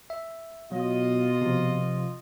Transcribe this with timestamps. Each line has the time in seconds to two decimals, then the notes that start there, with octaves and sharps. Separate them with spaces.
0.10 E5
0.72 B2 F#3 F4 D#5
1.42 C3 F3